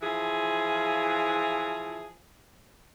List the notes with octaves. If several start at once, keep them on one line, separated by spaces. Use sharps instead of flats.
E3 F3 F4 G#4